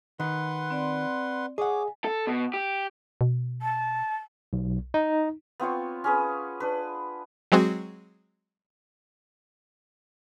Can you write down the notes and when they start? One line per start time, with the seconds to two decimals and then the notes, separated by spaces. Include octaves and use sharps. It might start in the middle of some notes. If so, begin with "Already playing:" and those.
0.20 D#3 B4 F#5 C6
0.71 C4 D5
1.58 G#4 C#5 D#5 F#5 G#5 D6
2.05 A4
2.27 B2
2.54 G4
3.21 B2
3.61 A5
4.53 B1
4.94 D#4
5.60 B3 C4 F4 C#5
6.04 C#4 G#4 B4
6.60 D4 B4
7.52 F#3 G#3 C4 F#4 G#4